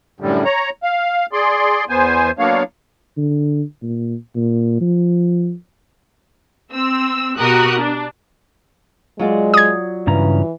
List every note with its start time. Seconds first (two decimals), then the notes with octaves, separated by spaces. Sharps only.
0.20 F#2 A2 D3 G3
0.45 C#5 A#5
0.83 F5
1.33 G#4 D5 C6
1.89 E2 B3 C5 G#5
2.39 F#3 A#3 B3 D4 C#5 F5
3.17 D3
3.83 A#2
4.36 A#2
4.81 F3
6.71 C4 E6
7.38 B2 F#4 G4 A#4 D#6 F#6
7.80 D4
9.19 F#3 G#3 F4 D5
9.54 D#6 G#6
10.07 G2 C#3 E3 A#5